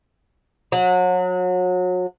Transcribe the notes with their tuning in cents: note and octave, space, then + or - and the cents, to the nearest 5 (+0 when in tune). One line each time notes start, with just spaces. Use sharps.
F#3 -30